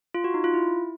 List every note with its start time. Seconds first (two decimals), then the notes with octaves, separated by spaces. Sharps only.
0.14 F4
0.24 F#4
0.34 D#4
0.44 F4
0.54 E4